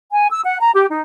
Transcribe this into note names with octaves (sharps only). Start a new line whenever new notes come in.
G#5
E6
F#5
A#5
G4
D#4